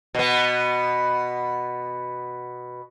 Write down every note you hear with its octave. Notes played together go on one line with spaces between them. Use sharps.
B2 B3